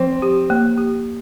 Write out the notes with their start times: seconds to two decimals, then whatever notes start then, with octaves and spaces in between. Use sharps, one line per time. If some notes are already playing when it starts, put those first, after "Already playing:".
Already playing: F3 C4
0.22 G4
0.50 A#3
0.78 G4